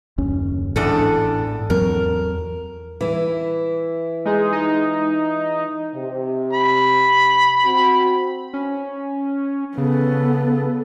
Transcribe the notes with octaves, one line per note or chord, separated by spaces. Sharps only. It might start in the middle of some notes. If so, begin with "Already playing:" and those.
F#1 D#2 C#4
A1 E2 G#2 D4 A4
E2 F#3 C4 A#4
E3 E4
G#3 D#4 G#4
D#4
C3
B5
C4 F#4
C#4
C#3 B3 A4